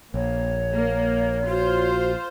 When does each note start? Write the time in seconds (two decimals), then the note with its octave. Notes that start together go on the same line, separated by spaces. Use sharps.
0.14 A#1 A#3 C#5
0.73 A#3
1.48 F4 F#4 C5